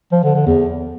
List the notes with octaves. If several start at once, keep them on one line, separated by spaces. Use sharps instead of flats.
F3
D3
D3
E2